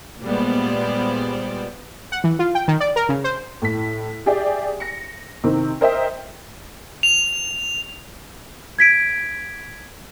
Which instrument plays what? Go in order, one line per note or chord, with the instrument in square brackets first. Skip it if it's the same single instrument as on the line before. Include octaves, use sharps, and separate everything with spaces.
[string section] A#2 G3 G#3 B3 C5 D5
[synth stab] F#5
E3
F4
G5
D#3
D5
A#4
C#3
C5
[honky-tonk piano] A2 B6
G4 G#4 D5 E5 G5
A#6 C#7
C3 D#3 C4
A#4 C5 D#5 E5 G5
[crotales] F7
[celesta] G#6 B6 D7